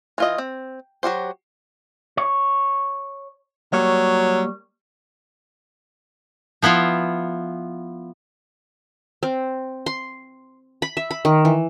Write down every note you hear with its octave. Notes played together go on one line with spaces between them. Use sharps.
E3 F4 D#5
C4
F#3 F#4 G4 C5
C#5
F#3 G3 A#3 C#5
F3 B3 E4 F4
C4
C6
B5
E5
B5
D#3
E3